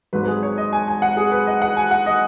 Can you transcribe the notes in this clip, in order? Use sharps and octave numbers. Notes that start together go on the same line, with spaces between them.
G#1 G#2 F#3 B4
B4
G#4
C#5
D#5
G#5
G#5
F#5
G#4
B4
D#5
F#5
G#5
F#5
D#5